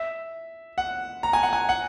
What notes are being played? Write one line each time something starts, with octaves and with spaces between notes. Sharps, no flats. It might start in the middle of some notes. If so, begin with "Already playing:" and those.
Already playing: E5
F#5
A#5
G#5
F#5
G#5
F#5